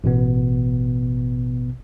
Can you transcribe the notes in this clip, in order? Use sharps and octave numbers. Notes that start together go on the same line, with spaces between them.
A1 B2 B3